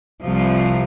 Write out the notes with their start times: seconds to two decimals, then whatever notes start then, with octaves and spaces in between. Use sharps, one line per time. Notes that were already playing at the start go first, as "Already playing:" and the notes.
0.23 C2 C3 F3